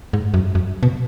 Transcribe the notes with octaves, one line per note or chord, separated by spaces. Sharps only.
G#2
F#2
F#2
B2